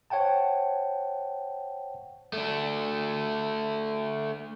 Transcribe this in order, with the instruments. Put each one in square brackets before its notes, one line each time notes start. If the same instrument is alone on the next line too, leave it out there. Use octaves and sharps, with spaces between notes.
[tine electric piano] C5 C#5 F#5 G5 A5
[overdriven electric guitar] A3 D4